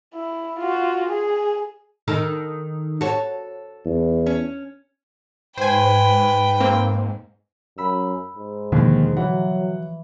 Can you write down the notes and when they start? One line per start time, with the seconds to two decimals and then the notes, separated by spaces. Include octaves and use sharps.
0.15 E4
0.60 F4 F#4
1.09 G#4
2.08 D#3 D#4 A4
3.01 F#4 A4 C#5
3.85 E2
4.26 C#4
5.58 G#2 B4 C5 G5 G#5
6.60 A#3 C4
7.78 F#2 B5 E6
8.36 G#2
8.72 D#2 B2 D3 F3 G#3
9.17 E3 F#3 F#5